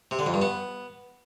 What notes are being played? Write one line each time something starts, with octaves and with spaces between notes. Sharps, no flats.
C3
D3
F2
G2
B3